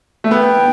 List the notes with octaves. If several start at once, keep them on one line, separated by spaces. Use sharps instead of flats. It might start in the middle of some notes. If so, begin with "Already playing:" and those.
A3
B3 G5